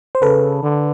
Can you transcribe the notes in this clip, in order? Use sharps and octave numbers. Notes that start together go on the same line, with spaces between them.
C5
C#3 A4 B4
D3